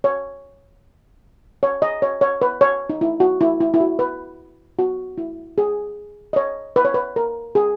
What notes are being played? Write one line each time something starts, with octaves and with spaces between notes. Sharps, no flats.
C#5
C#5
D#5
C#5
C#5
B4
C#5
D#4
E4
F#4
E4
E4
E4
F#4
B4
F#4
E4
G#4
D#5
C#5
B4
C#5
B4
A#4
G#4